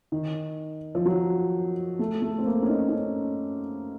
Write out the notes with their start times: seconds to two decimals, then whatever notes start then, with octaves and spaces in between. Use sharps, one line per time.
0.12 D#3
0.95 F3
1.05 F#3
1.99 A3
2.22 A3
2.39 C4
2.46 A#3
2.62 C#4
2.69 D#4
2.88 D#4
2.92 C#4